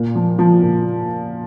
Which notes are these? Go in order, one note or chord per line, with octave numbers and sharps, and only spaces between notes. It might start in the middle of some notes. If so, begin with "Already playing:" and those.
Already playing: A#2
F3
F3
A#2